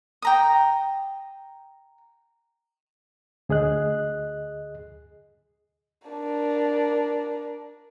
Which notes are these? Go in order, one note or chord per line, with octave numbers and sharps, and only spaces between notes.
G5 A#5 D#6
D2 G#4 D#5 F#6
D4 A#4